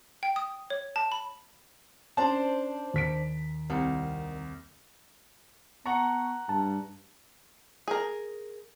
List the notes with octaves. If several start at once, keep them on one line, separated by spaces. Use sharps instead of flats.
G5
D#6
C#5
A5
B5
C#4 D4 C5 A5
D#2 B6 D7
C2 D#3
B3 F#5 A5 A#5 C#6
G2 A5
G#4 A#4